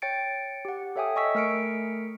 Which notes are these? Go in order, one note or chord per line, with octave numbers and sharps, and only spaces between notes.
C#5 G5 A6 C#7 D7
G4 F#5
A4 C#5 E5 G5 G#5 D#6
D#5 G#5 C#6 E6 B6
A3 A#4 F6 B6 C#7 D7